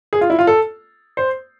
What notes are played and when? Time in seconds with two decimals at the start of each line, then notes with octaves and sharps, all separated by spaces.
0.13 G#4
0.21 F4
0.30 E4
0.39 F4
0.47 A4
1.17 C5